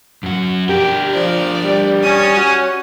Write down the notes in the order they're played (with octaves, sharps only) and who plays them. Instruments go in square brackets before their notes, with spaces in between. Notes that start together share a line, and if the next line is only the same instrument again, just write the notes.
[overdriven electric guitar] F#2 F#4
[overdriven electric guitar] D4 A#4 [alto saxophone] G4
[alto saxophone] F3 [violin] D5
[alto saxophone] G3
[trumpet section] C#4 [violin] D#6
[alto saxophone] F#4